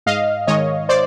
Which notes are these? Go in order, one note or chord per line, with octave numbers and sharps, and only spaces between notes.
G#2 D#5 F5
D#3 G#3 C#5 D#5
C5 D5